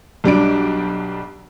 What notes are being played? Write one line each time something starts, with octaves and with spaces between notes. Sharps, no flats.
B1 G3 D4 D7